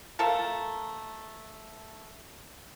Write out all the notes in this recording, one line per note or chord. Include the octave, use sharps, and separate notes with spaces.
A3 F4 A4 A#4